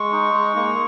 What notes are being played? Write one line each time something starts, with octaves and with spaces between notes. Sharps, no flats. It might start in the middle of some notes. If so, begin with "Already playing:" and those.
Already playing: G#3 C#6
D#4
G#3
A#3